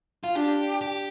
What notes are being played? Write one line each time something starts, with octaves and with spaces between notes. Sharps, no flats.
F4
D4 G4
G4